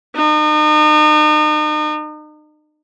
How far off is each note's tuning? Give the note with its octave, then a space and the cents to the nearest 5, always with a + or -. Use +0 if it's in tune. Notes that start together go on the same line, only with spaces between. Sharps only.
D#4 -40